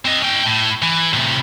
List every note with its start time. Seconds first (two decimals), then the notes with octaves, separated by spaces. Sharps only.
0.05 C4 D#5
0.22 C#4 G5
0.45 A2
0.82 E3
1.13 A2 C3